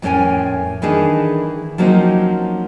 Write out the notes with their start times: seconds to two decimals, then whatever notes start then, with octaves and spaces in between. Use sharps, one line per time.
0.02 F2 A2 A#3 C#4 A#4 G#5
0.82 D#3 E3 D4 D#4 G#4 A4
1.78 F3 F#3 A#3 C4 C#4 D#4